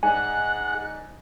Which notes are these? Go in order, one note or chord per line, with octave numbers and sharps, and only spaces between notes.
G#2 D4 G#4 F#5 G#5 F#6